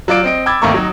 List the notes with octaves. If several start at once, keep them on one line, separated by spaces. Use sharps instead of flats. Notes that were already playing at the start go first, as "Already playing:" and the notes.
F#3 F4 D5 D7
C4 D#5 D7
G5 B5 D6 E6 G#6 A6
G#1 D#3 A3 A#3 A#5 C#6
F#3 D#4